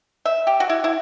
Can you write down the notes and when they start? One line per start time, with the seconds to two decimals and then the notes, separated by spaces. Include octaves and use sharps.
0.26 E5
0.47 G4
0.60 F#4
0.69 E4
0.84 E4